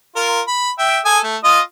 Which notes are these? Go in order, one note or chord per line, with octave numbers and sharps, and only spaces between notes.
F4 A#4
B5
E5 G5
A4 G#5 D#6
A3
F4 D#5 D#6